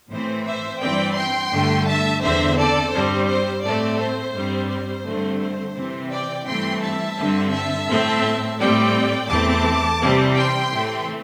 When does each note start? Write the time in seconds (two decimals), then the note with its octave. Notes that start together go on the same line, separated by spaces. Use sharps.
0.11 A2 E3 C4 C5
0.46 C5 E5
0.81 G2 E3 C4 D5 G5
1.16 G5 C6
1.52 G2 D3 A3
1.87 E5 A5
2.22 E2 D3 C4 C5 E5
2.58 A4 D5
2.93 G2 G3 C4 C5
3.28 C5
3.64 A2 A3 C4 A4 D5
4.00 C5
4.34 G2 G3 C4
4.70 C5
5.06 G2 D3 A3 C4
5.41 C5
5.76 C3 E3 C4
6.11 D5 G5
6.47 G2 E3 A3 C4 G5 C6
6.82 E5 A5
7.18 G2 D3 C4
7.53 E5 A5
7.89 A2 A3 C4
8.59 A2 G3 C4 D5 G5
9.30 E2 E3 A3 C4 A5 D6
10.01 C3 E3 G3 C4
10.36 G5 C6
10.71 A2 E3 A3 C4